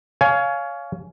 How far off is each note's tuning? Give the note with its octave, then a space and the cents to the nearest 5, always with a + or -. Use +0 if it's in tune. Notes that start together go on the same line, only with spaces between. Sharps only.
C#5 +25 F5 +0 G#5 +20